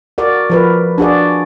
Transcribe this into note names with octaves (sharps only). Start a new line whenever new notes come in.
F#4 A#4 D5
F3 A#4 B4
D4 F#4 G#4 D5